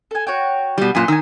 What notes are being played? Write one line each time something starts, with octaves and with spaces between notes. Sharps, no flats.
A4 G#5
F#4 C#5 G5
B2 G3
F#2 A#2 G#5 C6 F#6
D#3 G#5 E6